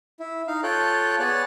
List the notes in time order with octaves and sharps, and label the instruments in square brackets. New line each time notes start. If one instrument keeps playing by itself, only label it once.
[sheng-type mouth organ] E4
D#4 F5
F4 A4 C#5 G5 F#6
B3 G#4 C#5 D5 F#6